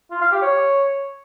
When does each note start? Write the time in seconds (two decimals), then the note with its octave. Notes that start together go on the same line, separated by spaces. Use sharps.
0.11 F4
0.21 F5
0.32 G4
0.42 C#5